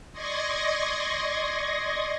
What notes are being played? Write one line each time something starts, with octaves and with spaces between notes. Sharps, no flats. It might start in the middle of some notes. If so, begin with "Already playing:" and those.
D5 D#5 C6 C#6 G#6 A#6